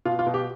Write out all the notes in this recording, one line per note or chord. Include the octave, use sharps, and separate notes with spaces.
B2 F4
F4
B2
G4